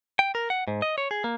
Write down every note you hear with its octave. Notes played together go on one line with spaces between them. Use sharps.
G5
A#4
F#5
G#2
D#5
C#5
G#4
A#3